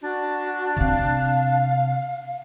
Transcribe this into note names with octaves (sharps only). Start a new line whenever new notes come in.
D4 F#4
C3 C4 F5